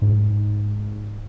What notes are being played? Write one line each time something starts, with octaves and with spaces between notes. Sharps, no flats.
G#2